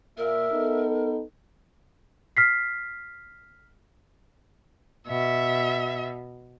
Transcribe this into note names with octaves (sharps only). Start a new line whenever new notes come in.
A#2 A#4 E5
B3 D#4 A4
F6 B6 C7
B2 E5